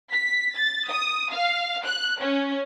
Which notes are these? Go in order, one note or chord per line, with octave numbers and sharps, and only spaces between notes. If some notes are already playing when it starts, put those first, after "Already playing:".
B6
A6
D#6
F5
F#6
C#4